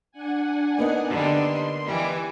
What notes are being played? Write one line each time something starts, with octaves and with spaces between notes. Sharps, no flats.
D4 F#5 G#5
A#3 B3 D#4
D3 G3 C6
E3 G3 G#5 D6